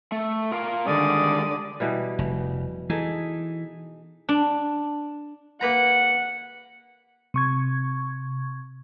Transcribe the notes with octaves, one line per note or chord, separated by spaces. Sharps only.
A3
F4 A#4 F5
D3 D#3 G3 G#3 D5 D#6
B2 E3 G3
F1
E3 D#4 G#4 A4
D4
A#3 B4 F#5 A#5
C3 C#6 G#6